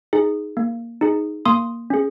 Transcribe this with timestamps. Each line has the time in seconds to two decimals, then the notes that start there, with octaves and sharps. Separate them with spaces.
0.13 D#4 G#4
0.57 A#3
1.01 D#4 G#4
1.45 A#3 C6 D#6
1.90 C#4 G#4